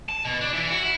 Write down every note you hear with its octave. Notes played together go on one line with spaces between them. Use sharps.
A5
B2
D4
E3
F#4
E4